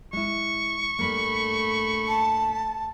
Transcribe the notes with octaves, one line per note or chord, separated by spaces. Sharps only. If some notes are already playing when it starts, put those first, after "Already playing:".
G#3 E4 C#6
G2 A3 A#3 B5
A5